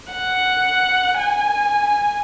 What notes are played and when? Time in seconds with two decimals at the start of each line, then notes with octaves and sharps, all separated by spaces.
0.12 F#5
1.18 G#5